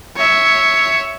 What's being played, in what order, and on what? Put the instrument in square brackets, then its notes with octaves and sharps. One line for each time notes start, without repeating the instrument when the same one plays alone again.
[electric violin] C#5 E5